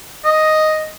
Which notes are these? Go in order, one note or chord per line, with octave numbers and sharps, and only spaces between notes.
D#5